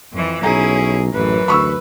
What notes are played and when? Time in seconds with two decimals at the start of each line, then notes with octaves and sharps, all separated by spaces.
0.13 F2 E3
0.43 B1 C#4 E4 G#4 A#5
1.13 A1 F#2 E3 B4
1.48 D2 B5 C#6 E6